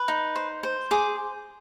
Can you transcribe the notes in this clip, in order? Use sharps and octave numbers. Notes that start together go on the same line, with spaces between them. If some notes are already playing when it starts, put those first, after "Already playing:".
Already playing: B4
D#4
C5
C5
G#4 D6